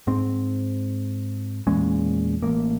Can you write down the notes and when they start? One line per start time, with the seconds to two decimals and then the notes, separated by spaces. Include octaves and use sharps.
0.07 G#2 C4
1.67 E2 A#2 G#3 C#4
2.42 A1 A#3